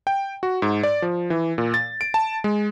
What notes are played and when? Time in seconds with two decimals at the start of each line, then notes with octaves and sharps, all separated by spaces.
0.07 G5
0.43 F#4
0.62 G#2
0.83 D5
1.02 F3
1.30 E3
1.58 A#2
1.74 A6
2.01 D7
2.14 A5
2.44 G#3